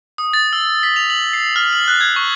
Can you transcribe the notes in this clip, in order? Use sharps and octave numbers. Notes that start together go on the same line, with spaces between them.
D#6
A6
E6
B6
F7
F#7
C7
F6
F#7
F#6
G#6
C#6